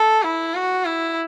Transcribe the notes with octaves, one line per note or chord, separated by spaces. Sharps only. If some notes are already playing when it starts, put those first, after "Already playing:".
Already playing: A4
E4
F#4
E4